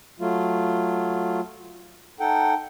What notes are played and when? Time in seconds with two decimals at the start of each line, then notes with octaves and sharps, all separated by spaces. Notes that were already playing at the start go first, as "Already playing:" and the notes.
0.20 F#3 A3 F4
2.20 D#4 A4 F#5 G5